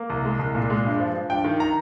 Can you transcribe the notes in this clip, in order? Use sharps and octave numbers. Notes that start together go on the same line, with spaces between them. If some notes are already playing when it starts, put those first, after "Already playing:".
Already playing: A#3
C2
G#3
C2
A#2
G#3
G2
F3
F3
G2 G5
D#3
A#5